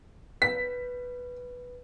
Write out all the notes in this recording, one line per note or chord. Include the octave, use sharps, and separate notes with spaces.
B4 B6